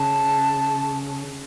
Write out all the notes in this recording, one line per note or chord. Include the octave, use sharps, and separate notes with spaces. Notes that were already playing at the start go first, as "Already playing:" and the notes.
Already playing: C#3 A5